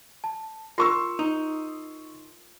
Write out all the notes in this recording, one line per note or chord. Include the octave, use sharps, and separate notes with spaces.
A5
F4 A#4 C6 C#6 E6
D#4